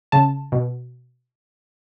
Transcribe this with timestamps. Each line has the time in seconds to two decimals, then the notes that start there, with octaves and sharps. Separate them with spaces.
0.12 C#3 A5
0.52 B2